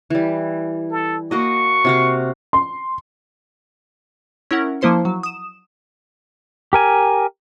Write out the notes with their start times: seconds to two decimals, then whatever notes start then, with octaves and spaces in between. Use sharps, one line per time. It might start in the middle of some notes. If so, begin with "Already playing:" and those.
0.10 E3 G3
0.91 A4
1.31 A#3 F#4 D#5 C#6
1.85 C3 F#4 F5
2.53 C6
4.51 C#4 E4 A#4 F#5
4.81 F3 A#3 E4 C5 C6 C#7
5.05 F#3
5.23 D#6 E7
6.73 G4 A#4 G#5